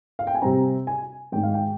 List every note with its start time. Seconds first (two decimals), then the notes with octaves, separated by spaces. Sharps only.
0.19 F5
0.27 G5
0.35 G#5
0.42 C3 G3 C4 A#5
0.87 G#5
1.32 G#2 D#3 G#3 G5
1.43 F5
1.54 G5